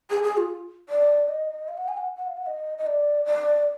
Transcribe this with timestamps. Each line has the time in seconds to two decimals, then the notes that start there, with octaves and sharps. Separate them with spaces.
0.10 G#4
0.23 G#4
0.37 F4
0.89 D5
1.28 D#5
1.68 F5
1.77 F#5
1.88 G#5
1.97 F#5
2.17 F#5
2.27 F5
2.37 F#5
2.46 D#5
2.78 D#5
2.86 D5
3.25 D5